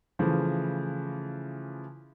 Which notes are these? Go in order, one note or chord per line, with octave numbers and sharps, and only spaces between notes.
C#3 E3 F3 A3